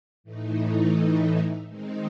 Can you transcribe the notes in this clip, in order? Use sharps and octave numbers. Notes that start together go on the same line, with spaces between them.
A2 E3 A3 D#4
D#3 G#3 C4 D#4